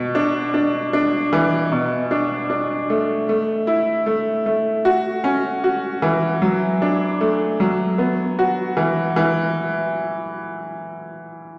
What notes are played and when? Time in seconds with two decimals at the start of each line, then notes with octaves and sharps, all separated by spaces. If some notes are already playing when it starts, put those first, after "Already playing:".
Already playing: B2
0.15 D4
0.54 D4
0.93 D4
1.33 E3
1.72 B2
2.11 D4
2.50 D4
2.90 A3
3.29 A3
3.67 E4
4.06 A3
4.46 A3
4.85 F#4
5.24 C#4
5.64 F#4
6.02 E3
6.42 F#3
6.82 D4
7.21 A3
7.60 F#3
7.98 B3
8.39 F#4
8.77 E3
9.16 E3